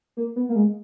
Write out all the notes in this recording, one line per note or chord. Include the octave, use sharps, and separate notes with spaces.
A#3
B3
A#3
G#3